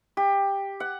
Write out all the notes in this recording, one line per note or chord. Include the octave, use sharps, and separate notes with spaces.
G4
F#5